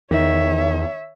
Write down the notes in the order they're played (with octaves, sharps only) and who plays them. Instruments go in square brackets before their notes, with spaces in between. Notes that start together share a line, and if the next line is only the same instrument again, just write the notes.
[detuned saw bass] E2 [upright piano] D#3 [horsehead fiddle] C#5 E5